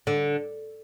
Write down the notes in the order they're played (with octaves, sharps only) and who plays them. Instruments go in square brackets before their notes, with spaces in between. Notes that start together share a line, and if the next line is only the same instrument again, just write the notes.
[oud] D3